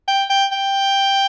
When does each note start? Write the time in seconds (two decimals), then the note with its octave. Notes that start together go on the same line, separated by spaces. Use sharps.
0.08 G5
0.30 G5
0.52 G5